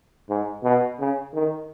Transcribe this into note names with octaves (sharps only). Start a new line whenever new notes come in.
G#2
B2
C#3
D#3